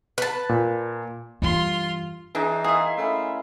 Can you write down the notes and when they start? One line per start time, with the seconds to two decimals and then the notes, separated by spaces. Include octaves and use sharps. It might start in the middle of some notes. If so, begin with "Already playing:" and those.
0.18 B4 A5
0.49 A#2
1.42 G2 E3 F4 C6
2.35 E3 D4 D#4 G#4
2.64 A#3 G#4 D#5 E5 C6
2.97 A3 C#4 E4